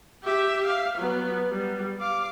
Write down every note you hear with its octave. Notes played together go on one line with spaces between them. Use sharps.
G4 E5
F5
F#3 B3
G3
F5 D6